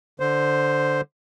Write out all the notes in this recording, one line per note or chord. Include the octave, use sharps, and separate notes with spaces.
D3 C5